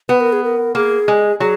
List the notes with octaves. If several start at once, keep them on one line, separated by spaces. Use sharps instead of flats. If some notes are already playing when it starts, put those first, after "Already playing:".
B3 B4
A#4
G#4
A#4
A#3 G#4
G#3
F#3 G#4